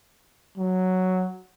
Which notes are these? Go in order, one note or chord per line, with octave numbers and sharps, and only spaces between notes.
F#3